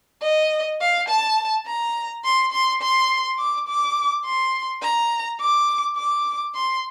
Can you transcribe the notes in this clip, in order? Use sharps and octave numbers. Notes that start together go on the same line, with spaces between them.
D#5
F5
A5
A#5
C6
C6
C6
D6
D6
C6
A#5
D6
D6
C6